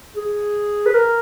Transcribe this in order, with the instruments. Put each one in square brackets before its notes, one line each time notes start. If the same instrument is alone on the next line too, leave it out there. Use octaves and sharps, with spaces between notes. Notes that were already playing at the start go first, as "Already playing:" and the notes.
[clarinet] G#4
B4
A#4